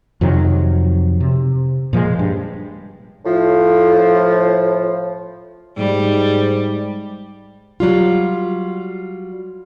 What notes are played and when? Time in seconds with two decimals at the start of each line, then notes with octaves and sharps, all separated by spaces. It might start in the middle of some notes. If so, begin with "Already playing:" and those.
0.21 F2 C3 D#3 F#3
1.21 C3
1.93 A#2 F3 G3 G#3
2.19 G2
3.25 A2 F3
5.78 G#2 G3
7.80 F#3 G3 F4